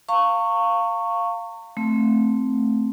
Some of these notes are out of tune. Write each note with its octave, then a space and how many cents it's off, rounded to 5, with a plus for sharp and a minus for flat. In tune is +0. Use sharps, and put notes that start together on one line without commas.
F5 +0 A#5 -40 C#6 +0
A3 +0 C4 +0